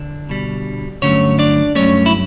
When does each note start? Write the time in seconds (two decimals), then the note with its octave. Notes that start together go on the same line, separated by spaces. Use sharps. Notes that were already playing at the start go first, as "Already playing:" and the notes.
Already playing: D3 D4
0.29 B2 G3
1.02 G2 D3 F#3 A3 C#4 C#5
1.39 D4 D5
1.75 G2 F#3 A3 C#4 C#5
2.06 E4